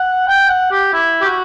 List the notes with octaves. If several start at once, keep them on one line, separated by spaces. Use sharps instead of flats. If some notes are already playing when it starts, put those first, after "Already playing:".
Already playing: F#5
G5
F#5
G4
E4
G4
F#4